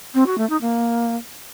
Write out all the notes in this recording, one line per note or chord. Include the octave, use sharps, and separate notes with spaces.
C4
F#4
A3
D#4
A#3